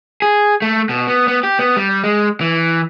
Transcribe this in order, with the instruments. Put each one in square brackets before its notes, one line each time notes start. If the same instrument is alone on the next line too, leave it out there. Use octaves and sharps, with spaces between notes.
[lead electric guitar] G#4
A3
B2
B3
B3
G4
B3
G3
G#3
E3